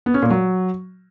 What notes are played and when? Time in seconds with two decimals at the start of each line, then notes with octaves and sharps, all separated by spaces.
0.06 B3
0.14 C#4
0.22 A#2
0.30 F#3